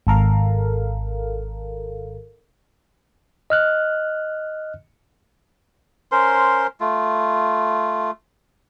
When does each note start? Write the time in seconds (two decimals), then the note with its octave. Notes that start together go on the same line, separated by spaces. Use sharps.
0.07 G#1 A4 A#4 F5
3.50 D#5 F6 F#6
6.11 C#4 A#4 C5 C6
6.80 A3 F4